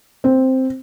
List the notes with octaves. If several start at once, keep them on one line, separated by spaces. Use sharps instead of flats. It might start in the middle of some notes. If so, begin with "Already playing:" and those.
C4